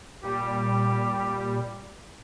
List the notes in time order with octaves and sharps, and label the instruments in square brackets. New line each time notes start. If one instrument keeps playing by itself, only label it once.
[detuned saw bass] A#2 [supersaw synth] G3 [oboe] G4